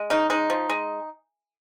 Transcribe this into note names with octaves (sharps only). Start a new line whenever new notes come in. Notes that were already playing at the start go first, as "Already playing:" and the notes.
Already playing: G#3
C#3 D#4
G#3 D#4
F3
G#3